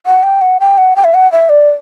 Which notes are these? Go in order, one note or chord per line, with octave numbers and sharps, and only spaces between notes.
F#5
G5
F#5
G5
F#5
G5
E5
F#5
E5
D5